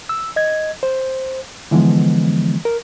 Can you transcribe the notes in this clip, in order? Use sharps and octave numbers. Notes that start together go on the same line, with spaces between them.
E6
D#5 G#6
C5
D3 E3 F3 G#3 B3
A#4